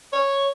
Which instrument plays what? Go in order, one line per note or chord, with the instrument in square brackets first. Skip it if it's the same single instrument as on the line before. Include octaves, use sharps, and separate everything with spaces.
[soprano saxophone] C#5